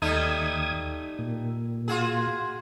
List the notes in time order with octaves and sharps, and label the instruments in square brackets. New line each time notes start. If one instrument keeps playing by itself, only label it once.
[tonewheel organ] D#2 D#6 G#6 [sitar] G3 A3 D#4
[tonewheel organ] A#2
[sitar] F4 F#4 G#4